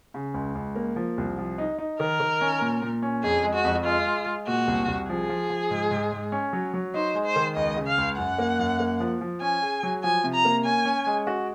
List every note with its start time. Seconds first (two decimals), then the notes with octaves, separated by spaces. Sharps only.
0.14 C#3
0.34 C#2
0.55 C#2
0.76 A#3
0.96 F3
1.18 C2
1.38 F3
1.58 D#4
1.78 D#4
2.00 D#3 A#4
2.20 D#3
2.41 C#4
2.61 A#2
2.82 A#2
3.02 C#4
3.23 F2 G#4
3.43 G#3
3.54 F#4
3.64 F2
3.85 G#3 F4
4.06 G#3
4.26 G#3
4.47 A#2 F#4
4.67 C2
4.88 C2
5.08 F3 G#4
5.29 F3
5.50 F3
5.71 G#2
5.91 G#2
6.12 G#2
6.32 C#4
6.53 F#3
6.74 F#3
6.94 D#4 C5
7.15 G#3
7.25 C5
7.36 D#3
7.56 C#2 D#5
7.77 C#3
7.87 F5
7.98 C#2
8.17 F#2 F#5
8.38 A#3
8.59 F#2
8.80 A#3
9.00 F3
9.21 F3
9.41 C#4 G#5
9.62 G#4
9.83 F#3
10.04 F3 G#5
10.24 C3
10.34 A#5
10.45 A#3
10.65 C#4 G#5
10.85 C#4
11.06 G#3
11.27 F#4